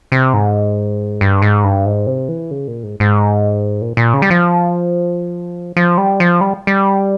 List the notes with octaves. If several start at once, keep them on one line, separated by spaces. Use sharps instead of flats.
C3
G#2
G2
G#2
G2
G#2
C3
E3
C#3
A#2
G#2
G#2
A#2
A#2
C#3
G3
F3
F3
G3
F3
G3
G3